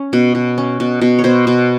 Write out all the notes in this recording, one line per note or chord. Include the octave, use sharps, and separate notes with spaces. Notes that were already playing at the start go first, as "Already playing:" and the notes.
Already playing: C#4
B2
B2
C#4
B2
B2
C#5
B2 C5
B2